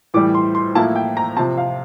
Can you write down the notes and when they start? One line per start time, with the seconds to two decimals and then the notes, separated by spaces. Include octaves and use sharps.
0.14 A2 E3 G3 D6
0.35 C6
0.55 C6
0.75 A2 F3 A#3 E4 A5
0.96 G5
1.17 A#5
1.37 C3 F3 C4 A5
1.58 F5